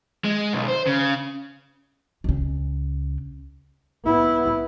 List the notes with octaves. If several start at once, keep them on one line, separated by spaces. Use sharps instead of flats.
G#3
B1
C5
C#3
C#2 C#3
B3 E4